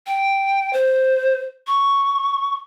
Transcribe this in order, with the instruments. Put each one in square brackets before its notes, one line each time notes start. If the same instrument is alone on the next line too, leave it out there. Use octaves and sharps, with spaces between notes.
[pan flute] G5
C5
C#6